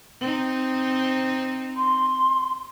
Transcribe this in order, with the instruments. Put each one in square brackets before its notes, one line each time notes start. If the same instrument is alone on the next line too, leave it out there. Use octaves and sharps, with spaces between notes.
[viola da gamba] C4 D#4
[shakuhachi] C6